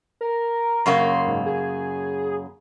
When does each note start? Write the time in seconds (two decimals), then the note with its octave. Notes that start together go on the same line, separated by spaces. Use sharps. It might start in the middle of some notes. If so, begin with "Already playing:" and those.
0.21 A#4
0.86 F#2 C#3 A#3 C6
1.28 G#2
1.46 G#4